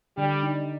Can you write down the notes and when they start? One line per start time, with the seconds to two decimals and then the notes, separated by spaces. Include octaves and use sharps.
0.17 D3 G3
0.43 D#4